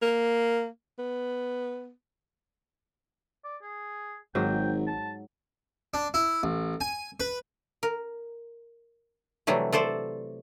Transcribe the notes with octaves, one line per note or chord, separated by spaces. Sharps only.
A#3
B3
D5
G#4
G#1 G#2 F#3 G5
A5
D4
E4
A1
G#5
B4
A#4
C3 E3 F#3 G3 A3
A3 A4 C5 D5